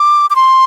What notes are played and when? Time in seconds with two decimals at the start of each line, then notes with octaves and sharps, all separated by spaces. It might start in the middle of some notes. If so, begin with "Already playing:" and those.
Already playing: D6
0.30 D6
0.36 C6